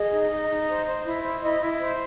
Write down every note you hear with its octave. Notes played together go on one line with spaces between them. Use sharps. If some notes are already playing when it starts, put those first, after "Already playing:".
Already playing: G#4 D#5
D#4
D#4
D#4
C5
C5
E4
C5
E4 D#5
E4
D#5
C5